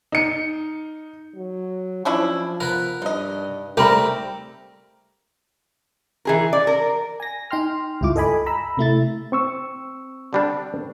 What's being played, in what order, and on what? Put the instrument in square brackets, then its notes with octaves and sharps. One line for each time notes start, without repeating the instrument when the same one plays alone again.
[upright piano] D#4 C#7
[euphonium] F#3
[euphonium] F3 [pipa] C#4 D4 E4
[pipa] B3 [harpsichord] A#4 B4
[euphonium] G2 [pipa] D#4 D#5
[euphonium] G3 [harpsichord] A3 C4 G4 [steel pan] A#4 [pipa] G5 B5
[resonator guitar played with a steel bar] E3 G#4 A#4
D5
A#4
[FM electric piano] G#5 A#6
D#4 G5 C6 F6
C#2 G2 E4 F4 D6
A4 D#5 G#5 B5
A#5 B5 E6
C3 A3 E4 A6
[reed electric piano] C4 C#6 E6
[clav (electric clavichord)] D3 G3 D4